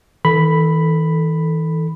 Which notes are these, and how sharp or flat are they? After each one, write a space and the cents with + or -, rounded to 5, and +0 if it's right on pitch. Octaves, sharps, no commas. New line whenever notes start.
E3 -45 A4 +0 B5 +0